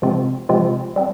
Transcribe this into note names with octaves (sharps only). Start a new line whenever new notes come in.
C3 F3 G#3 C4 F4
C3 F3 G#3 C4 F4
G3 C4